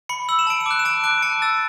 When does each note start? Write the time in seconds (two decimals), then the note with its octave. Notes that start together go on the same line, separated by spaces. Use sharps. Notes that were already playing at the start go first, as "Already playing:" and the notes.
0.09 B5 C#7
0.29 E6 F#7
0.39 E7
0.47 A5 D7
0.60 E7
0.66 D6 F#6
0.79 E7
0.85 A5 D7
1.04 D6 F#6 D7
1.22 A5 C#7
1.42 E6 A6